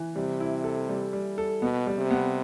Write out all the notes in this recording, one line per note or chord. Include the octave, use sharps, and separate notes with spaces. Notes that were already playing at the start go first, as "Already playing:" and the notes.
Already playing: E3
C3 G3
E4
A4
G3
G3
A4
B2 B3
G3
C3
B3